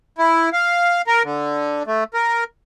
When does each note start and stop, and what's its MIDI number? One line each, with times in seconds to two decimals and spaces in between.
0.18 0.50 64
0.53 1.02 77
1.07 1.23 70
1.24 1.83 50
1.87 2.04 57
2.14 2.44 70